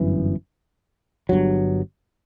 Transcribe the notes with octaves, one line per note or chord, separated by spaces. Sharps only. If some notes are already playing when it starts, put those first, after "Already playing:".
Already playing: G1 F#2 E3
G1 G2 F#3